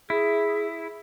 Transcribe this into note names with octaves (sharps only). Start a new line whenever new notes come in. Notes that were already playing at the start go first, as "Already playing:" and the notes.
E4 G#4